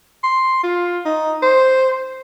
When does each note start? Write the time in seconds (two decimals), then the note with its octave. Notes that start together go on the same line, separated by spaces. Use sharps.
0.23 C6
0.63 F4
1.05 D#4
1.42 C5